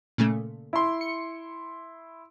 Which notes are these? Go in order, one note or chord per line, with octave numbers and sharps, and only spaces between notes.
A#2 C#3 A3
E4 C6
C#7